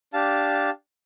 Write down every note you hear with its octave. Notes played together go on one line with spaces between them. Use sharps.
D4 G4 F5 A5